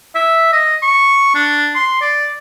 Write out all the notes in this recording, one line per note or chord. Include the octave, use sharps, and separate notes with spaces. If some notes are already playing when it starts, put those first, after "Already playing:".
E5
D#5
C#6
D4
C6
D5